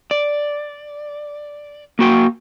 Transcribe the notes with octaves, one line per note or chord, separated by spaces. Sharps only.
D5
A#3 F#4 G5